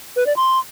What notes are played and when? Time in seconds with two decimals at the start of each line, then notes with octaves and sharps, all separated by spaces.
0.16 B4
0.26 D5
0.36 C6